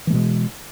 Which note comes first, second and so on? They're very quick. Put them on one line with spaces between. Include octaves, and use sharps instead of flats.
E3 A3 B2 G#3